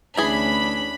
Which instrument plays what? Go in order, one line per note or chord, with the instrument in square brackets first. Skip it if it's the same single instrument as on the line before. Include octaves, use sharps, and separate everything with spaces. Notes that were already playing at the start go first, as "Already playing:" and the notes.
[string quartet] D2 C#4 D4 [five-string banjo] E3 G#4 [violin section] B5